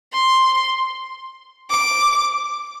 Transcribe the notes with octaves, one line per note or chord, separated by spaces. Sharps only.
C6
D6